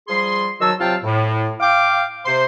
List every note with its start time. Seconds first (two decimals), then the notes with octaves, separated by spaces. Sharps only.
0.09 F3 G3 G#4 C6
0.60 D#3 F#3 F#4 A5 E6
0.80 C3 F#3 F4 F5 G5 A5
1.03 A2
1.60 F5 G5 D6
2.26 C3 C5 C6